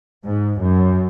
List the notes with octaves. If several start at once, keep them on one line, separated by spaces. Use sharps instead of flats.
G#2
F#2